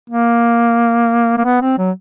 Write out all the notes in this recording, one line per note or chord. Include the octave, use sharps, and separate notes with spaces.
A#3
A#3
B3
C4
F#3